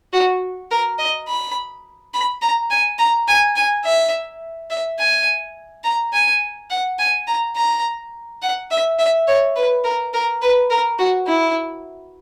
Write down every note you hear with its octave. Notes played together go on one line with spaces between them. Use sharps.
F#4
A#4
D#5
B5
B5
A#5
G#5
A#5
G#5
G#5
E5
E5
G#5
A#5
G#5
F#5
G#5
A#5
A#5
F#5
E5
E5
C#5
B4
A#4
A#4
B4
A#4
F#4
E4